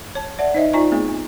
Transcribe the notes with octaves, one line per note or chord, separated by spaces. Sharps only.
C#5 A5
C#5 D5 E5 F#5 A5
D#4 C5 D#5 E5
D#4 F4 D5 G#5 A#5 C#6
A3 B3 C4 G#4